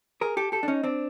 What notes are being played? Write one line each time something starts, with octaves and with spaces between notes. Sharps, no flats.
G#4 A#4
G4 A4
G4 A4
D4
C#4 D#4
C4 D4